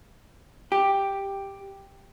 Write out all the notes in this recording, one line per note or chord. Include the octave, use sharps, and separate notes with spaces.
G4